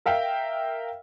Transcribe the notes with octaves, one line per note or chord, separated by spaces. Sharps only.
A#4 E5 F5 G5